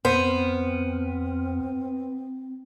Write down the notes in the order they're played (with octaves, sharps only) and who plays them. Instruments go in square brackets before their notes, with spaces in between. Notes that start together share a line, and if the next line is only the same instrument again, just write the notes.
[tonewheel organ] F2 [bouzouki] B3 [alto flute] C4 [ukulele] C5